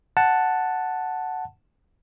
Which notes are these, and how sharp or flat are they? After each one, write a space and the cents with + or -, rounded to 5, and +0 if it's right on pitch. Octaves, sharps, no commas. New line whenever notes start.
F#5 +0 A5 +0